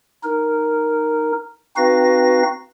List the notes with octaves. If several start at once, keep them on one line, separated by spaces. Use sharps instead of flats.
D#4 A#4
C4 D#4 F#4 B4 F5 A#6